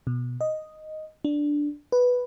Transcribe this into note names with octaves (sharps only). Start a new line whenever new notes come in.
B2
D#5
D4
B4